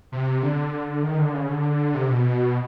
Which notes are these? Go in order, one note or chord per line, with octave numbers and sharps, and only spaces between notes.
C3
D3
D#3
D3
C#3
D3
C3
B2